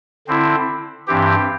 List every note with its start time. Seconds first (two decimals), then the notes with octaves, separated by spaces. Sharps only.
0.27 D3 C4 E4
1.07 G2 E3 C4 G4